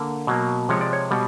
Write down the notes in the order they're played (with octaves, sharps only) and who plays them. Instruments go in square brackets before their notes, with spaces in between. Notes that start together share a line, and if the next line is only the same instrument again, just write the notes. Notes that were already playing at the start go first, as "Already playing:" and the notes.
Already playing: [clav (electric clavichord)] D3 A#3
B2 F#3 A#3
C3 F3 G#3 C#5
D5
C#5
B2 G3